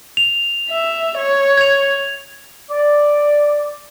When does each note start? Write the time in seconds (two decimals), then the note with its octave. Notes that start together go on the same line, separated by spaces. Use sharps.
0.17 F7
0.70 E5
1.18 C#5
1.58 G#6 F7
2.71 D5